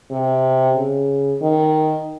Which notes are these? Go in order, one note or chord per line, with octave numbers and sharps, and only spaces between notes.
C3
C#3
D#3